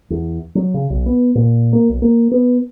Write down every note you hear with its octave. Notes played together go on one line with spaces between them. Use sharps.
E2
F#3
C#3
B1
B3
A#2
A#3
B1
A#3
B3